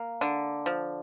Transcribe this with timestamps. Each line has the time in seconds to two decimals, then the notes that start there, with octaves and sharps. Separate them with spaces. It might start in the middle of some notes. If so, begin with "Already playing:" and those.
Already playing: A#3
0.21 D3
0.66 F3